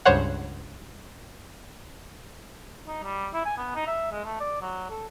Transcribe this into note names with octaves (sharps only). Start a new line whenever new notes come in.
C#2 G2 C5 C#5 F#5
D#4
G3
E4
G#5
B3
D#4
E5
G#3
A3
D5
F#3
A4